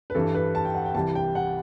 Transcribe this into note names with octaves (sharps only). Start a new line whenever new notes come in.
B4
G2 E3 G3 A4
B4
A5
G5
F#5
G5
C2 C3 E3 G3 A5
G5
F#5